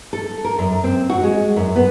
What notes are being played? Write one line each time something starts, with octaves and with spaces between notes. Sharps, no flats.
A4
A#4
F#2
C4
F#4
G#3
F#2
B3